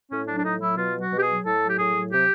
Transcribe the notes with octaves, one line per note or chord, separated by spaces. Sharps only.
A2 C#4
F#3 D4
D4
A2 D#4
F#3 E4
B2 F4
F#3
F#4
B2
G4
G#4
F#3
A2 A4
F#3
G4
A2 G#4
F#3
C3 G4